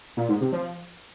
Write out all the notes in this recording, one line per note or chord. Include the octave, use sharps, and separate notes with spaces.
A#2
G#2
C3
F3